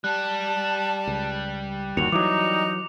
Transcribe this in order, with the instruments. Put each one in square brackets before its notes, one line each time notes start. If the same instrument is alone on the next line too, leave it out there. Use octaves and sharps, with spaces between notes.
[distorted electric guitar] G3 [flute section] A5 [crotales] F#6
[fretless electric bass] C#2
[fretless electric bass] G1 D#2 [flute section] F#4 [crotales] C#7 F7
[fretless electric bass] E3 F#3 [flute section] D#4 [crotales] D6